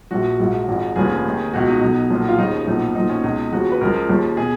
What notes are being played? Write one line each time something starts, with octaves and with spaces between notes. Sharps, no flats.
A#1 A#2 F3 F#4
A#1 G#2 F3
G#1 G#2 F3
F1 D#2 C#3 F3 G#4
D#2 D#3
C#2 B2 F#4
D#4
B1 B2
B1 A#2 F3
F4
D#2 C#3 F3 D#4
B1 A#2 F3 D#4
B1 A#2 F3 D#4
C#4
C#2 B2 D#4
D#2 C#3 F3 F#4
B4
C#2 C#3 F3 A#4
D#2 C#3 F3
B2 G#4